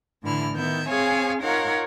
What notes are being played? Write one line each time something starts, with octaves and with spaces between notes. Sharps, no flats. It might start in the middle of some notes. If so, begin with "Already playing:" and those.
A2 D3 E3 E4 F6
D#3 B3 E5 G6
C4 G#4 C#5 F5 G#5
D#4 F4 A#4 C#5 F5 F#5